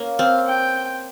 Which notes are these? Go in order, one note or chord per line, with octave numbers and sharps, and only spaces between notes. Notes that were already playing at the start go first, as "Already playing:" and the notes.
Already playing: A#3 C#4
C4 F5
G5